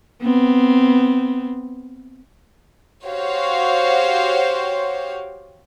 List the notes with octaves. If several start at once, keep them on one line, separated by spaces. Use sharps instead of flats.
B3 C4
F#4 G4 C5 C#5 F5